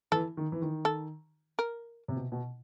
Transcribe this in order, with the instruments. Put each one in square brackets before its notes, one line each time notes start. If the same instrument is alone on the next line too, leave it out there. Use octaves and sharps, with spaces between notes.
[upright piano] E3 [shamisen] A4
[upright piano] D#3
E3
D#3
[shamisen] A4
A#4
[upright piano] C3
B2
B2